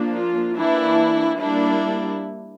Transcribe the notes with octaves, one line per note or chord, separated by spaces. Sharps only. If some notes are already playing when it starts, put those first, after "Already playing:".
Already playing: F3 A#3 D4
F4
E3 A#3 D4 E4
G3 A#3 D4 E4